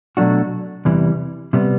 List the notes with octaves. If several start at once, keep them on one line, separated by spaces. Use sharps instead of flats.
B2 F#3 A3 D4 F#4
E2 C3 E3 G3
C3 G3 B3